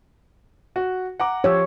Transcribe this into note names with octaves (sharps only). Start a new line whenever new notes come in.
F#4
F#5 A#5 D6
F3 G4 C#5 E6